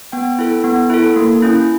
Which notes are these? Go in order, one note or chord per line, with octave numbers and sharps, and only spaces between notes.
B3 G5
E4 A4
B3
E4 A4
A#3
C#4 E4